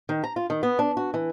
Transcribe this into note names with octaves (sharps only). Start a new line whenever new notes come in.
D#3
A#5
F4
D#3
B3
D4
F#4
E3